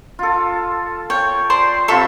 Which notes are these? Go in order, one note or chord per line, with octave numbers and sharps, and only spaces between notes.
F4 A4
C#5 G5
C5 D5 C6
C3 F4 A4 C#5 E5 B5